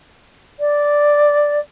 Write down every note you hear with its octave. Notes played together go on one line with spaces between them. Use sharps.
D5